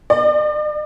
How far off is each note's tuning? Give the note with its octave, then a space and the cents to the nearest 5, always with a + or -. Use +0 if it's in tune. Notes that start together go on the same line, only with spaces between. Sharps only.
D5 +45